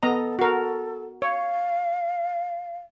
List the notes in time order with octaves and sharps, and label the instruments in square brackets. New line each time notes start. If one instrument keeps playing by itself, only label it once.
[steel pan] B3 D#5 A#5 [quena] A4
[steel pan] F#4 A#4 [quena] A4
[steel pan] C#5 [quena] F5